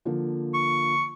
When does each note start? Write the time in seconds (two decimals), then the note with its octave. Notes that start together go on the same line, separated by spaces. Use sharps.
0.05 D3 F3 A#3
0.54 C#6